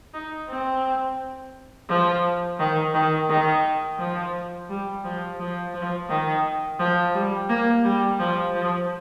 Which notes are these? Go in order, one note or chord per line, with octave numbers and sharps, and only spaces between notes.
D#4
C4
F3
D#3
D#3
D#3
F3
G3
F3
F3
F3
D#3
F3
G3
A#3
G3
F3
F3